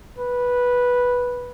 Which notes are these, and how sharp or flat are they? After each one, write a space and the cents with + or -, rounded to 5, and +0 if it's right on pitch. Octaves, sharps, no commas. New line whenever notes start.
B4 -10